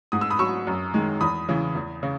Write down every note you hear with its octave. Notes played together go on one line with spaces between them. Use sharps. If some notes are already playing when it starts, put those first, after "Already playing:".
G#2 D#6
E6
B5 D#6
F#3 C#6 E6
F#2
D#3 G#3
E2 B5 D#6
C#3 E3
E2
C#3